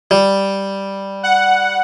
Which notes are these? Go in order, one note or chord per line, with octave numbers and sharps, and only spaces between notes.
G3
F#5